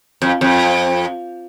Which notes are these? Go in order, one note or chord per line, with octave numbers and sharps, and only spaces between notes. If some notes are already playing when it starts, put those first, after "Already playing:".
F2
F2